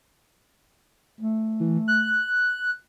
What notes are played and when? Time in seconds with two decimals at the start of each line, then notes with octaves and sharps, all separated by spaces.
1.21 A3
1.60 E3
1.88 F#6